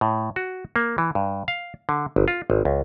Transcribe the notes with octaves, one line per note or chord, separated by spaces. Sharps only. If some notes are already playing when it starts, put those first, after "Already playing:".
A2
F#4
A#3
E3
G2
F5
D3
G1
F4
G#1
C#2